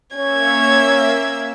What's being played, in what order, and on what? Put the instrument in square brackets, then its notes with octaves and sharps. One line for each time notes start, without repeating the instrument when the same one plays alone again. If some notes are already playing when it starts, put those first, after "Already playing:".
[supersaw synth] A#3 E5 E6 [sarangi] C#4 [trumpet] C#5 [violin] G#6